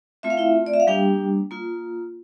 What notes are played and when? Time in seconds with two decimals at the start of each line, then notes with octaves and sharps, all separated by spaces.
0.23 A3 C4 F4 E5
0.30 F5
0.37 E4 E5
0.66 D5
0.74 E5
0.80 F5
0.87 G3 A#3 D4 G4 G5
1.51 A#3 F4